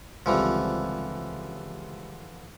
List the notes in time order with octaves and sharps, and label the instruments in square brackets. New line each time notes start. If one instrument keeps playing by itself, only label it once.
[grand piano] C#2 G3 C4 [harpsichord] D3 E3 F3